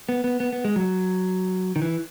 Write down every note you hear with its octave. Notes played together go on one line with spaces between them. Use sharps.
B3
B3
B3
B3
G#3
F#3
D#3
E3